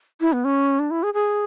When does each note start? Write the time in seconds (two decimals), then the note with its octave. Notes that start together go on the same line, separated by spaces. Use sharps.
0.21 E4
0.33 B3
0.45 C#4
0.79 D4
0.91 E4
1.03 G#4
1.14 G#4